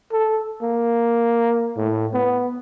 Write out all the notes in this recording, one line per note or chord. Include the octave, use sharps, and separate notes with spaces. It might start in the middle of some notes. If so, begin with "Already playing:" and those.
A4
A#3
A2
B3